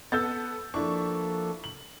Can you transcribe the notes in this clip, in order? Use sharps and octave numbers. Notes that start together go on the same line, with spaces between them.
B3 A4 E6 G6 A6
F3 A#3 D4 E4 A4 C#6
F#7